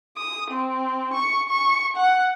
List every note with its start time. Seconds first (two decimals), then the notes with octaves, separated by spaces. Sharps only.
0.17 D#6
0.50 C4
1.13 C#6
1.49 C#6
1.96 F#5